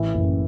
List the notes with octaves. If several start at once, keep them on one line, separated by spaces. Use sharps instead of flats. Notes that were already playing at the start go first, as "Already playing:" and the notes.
Already playing: A1 E3
F#1